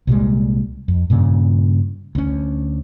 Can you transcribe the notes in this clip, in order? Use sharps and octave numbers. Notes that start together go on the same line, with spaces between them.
C2 A#2 G3 G#3
F2
G2 A#2 C#3
D2 C#4